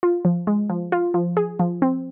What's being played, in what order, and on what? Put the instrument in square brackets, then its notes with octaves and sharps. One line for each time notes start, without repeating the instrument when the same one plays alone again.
[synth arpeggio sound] F4
F3
G#3
F3
F4
F3
G#4
F3
C4